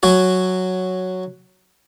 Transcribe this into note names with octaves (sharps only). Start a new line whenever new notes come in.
F#3 F#4 G#5